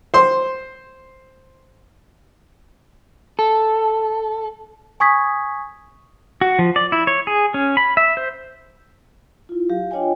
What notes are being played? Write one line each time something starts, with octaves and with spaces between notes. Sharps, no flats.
C5 C6
A4
G#5 C#6 D#6 G#6 B6
F#4
F3
D5
E4
C#5
G#4
C#4
B5
E5
C5
E4 F4
F#3 G4 F5
D4 F4 C#5 D#5 G5 G#5